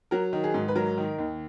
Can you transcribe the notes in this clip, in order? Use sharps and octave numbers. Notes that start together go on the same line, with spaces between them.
F#3 A#4
D#3
G#4
G#2
B4
F#3 A#4
D#3
D#2